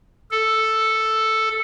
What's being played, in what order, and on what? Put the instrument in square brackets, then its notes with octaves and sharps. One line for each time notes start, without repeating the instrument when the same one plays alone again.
[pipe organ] A4